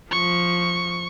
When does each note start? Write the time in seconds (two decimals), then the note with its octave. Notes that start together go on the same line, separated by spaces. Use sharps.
0.11 F3 C#6